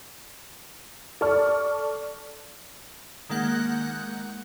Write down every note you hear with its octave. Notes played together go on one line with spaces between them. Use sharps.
A4 D5 A5 C#6 F6
D#3 G#3 A#3 F#5 F#6 G6